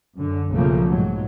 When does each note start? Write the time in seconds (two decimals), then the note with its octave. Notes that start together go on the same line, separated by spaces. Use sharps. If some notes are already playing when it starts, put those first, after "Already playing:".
0.19 F#2 D3
0.51 B1 C#3 F3 A3 A#3
0.88 G#2 F#3